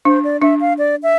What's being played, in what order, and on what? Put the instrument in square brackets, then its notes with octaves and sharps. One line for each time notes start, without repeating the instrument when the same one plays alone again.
[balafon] D4 [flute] C5
[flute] D5
[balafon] D4 [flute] E5
[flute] F5
D5
E5